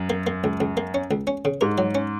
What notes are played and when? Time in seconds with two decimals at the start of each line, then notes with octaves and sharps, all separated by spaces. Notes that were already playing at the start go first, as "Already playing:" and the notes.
Already playing: F#2
0.10 A#3
0.27 A#3
0.44 C#2
0.60 C#2
0.77 A#3
0.94 C#4
1.11 C#2
1.27 C#4
1.45 C#3
1.61 G#2 A#4
1.78 F#3
1.95 C#4